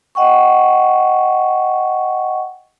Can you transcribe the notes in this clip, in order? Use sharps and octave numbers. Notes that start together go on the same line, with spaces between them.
D#5 F#5 G5 C#6